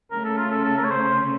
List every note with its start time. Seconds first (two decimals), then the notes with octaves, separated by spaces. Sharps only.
0.11 C#3 A3 C#4 A#4
0.25 A4
0.38 F4
0.51 A4
0.64 A4
0.77 A#4
0.84 C#5
0.91 C5